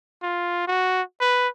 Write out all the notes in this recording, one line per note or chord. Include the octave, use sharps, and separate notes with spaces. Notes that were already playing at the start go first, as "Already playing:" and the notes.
F4
F#4
B4